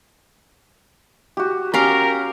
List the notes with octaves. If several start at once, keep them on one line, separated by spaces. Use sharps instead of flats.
F#4 G4
C#4 G4 A#4 F5 A#5